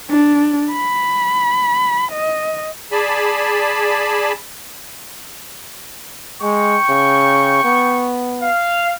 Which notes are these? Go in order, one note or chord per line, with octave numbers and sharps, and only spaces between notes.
D4
B5
D#5
G#4 D5 G#5 A5 B5
G#3 G5 C#6
C#3
B3
F5